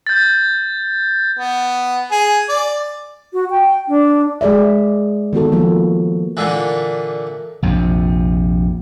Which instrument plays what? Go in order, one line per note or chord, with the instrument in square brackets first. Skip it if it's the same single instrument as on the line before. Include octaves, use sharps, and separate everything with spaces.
[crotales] G6 A6
[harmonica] B3
G#4
D5
[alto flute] F#4
G5
D4
[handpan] G#3 G#4 D5 E5
D#3 B3 F#4 A4
F3 A#3
[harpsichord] A#2 D3 E3
[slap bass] A#1 F2 C3